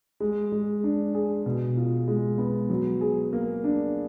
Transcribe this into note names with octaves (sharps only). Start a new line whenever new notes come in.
G#3
G#3
D4
G#4
B2
F4
G#3
B3
F#3
G#4
A#3
D4